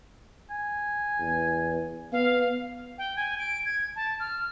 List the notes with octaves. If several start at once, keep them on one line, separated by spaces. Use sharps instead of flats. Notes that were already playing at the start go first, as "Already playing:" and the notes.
G#5
E2
B3 F5
G5
G#5
D7
G#6
A5
F6